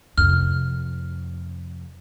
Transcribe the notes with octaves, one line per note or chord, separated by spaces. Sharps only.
F2 C3 F6